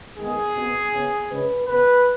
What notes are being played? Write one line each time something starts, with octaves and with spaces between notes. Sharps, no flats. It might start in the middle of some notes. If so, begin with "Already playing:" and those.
D#3 G#3 B3 G#4
B2 B3
C#3 B3
C#3 G#3 C#4 B4
C#3 B3 B4